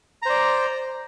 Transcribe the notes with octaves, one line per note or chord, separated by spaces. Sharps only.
C5 D5 A#5